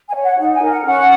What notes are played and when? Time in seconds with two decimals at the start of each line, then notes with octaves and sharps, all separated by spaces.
0.08 G#5
0.15 C#5
0.24 F#5
0.39 D#4 F#5
0.54 G#5
0.62 A#4
0.70 F#5
0.85 C#4 F#5